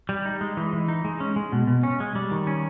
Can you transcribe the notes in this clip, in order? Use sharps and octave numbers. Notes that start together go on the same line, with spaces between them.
G3
D#4
G#3
E3
E3
D#4
G#3
C#4
G#3
B2
B2
C#4
G#3
G3
D#3
C#4